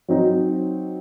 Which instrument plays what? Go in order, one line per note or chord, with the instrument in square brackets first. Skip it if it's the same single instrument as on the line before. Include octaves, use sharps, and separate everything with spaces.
[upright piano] F#3 C4 D#4